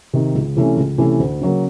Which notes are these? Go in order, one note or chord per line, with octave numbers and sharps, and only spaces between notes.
C3 D#3
C#2
C3 E3 A3 C#4
C#2
C3 E3 A3 C#4
D2
C#3 F#3 A#3